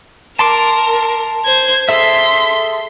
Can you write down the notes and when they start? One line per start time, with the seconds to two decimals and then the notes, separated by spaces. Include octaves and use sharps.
0.39 A#4 A5 C6 D6
1.45 C5 G#6
1.89 G#4 A4 E5 C6 B6